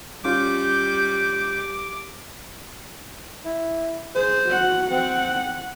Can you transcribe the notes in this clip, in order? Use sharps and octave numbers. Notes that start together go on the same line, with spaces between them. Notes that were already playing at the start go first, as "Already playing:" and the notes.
G3 C#4 F4 D6 G6
E4
G#4 C5
F#4 F#5
C4 F#5